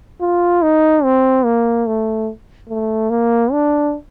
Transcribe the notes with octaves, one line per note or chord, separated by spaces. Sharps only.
F4
D#4
C4
A#3
A3
A3
A#3
D4